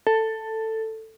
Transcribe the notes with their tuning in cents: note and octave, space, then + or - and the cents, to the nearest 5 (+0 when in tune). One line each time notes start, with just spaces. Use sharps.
A4 +10